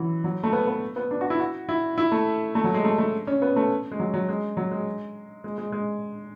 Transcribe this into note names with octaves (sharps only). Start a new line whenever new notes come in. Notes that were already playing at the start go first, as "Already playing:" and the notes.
Already playing: E3 F#3
F#3
A3
B3
B3
B3
D4
F#4
E4
F#4
E4
E4
A3
A3
F#3
G#3
A3
A3
C#4
B3
A3
G#3
F#3
F#3
G#3
F#3
G#3
G#3
G#3
G#3